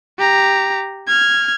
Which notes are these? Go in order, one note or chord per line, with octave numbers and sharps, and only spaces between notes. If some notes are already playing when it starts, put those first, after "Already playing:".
G4 A#5
F6 G#6